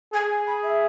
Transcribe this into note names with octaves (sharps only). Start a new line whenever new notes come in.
G#4 G#5
B5
E5